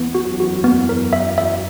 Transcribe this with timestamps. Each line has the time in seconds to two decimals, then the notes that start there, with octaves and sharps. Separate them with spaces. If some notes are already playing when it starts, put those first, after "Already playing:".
Already playing: E2 E3 B3
0.15 F#2 F#3 F#4
0.40 F#4
0.64 B3
0.89 A#4
1.13 E5
1.38 E5